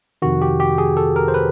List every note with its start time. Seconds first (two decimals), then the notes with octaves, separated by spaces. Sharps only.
0.22 F2 C3 D#3 F#4
0.42 G4
0.60 G4
0.78 G#4
0.97 A4
1.16 A#4
1.28 C5
1.34 B4